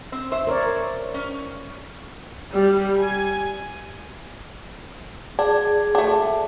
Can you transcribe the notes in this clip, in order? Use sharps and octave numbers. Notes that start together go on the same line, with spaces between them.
C4
C5 E5
A#4 C#5 D5
C#4
G3
G#5
D4 G#4
A3 D4